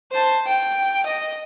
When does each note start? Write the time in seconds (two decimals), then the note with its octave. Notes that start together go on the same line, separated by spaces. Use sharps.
0.12 C5 A5
0.46 G5
1.06 D#5